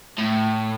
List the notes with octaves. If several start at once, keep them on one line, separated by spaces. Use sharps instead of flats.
A2